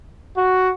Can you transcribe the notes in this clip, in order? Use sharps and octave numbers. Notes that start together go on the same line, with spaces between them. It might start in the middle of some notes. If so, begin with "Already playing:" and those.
F#4